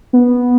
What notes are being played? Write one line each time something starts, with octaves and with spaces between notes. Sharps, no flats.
B3